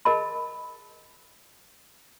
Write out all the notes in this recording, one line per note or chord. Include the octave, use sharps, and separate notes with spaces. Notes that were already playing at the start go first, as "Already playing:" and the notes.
G#4 A#4 D#5 A5 B5